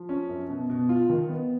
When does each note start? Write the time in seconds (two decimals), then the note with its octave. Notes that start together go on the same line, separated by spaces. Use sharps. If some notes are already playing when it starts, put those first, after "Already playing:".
Already playing: F3
0.09 C#4
0.29 F#2
0.49 B2
0.70 B2
0.89 F4
1.10 D#3
1.29 B3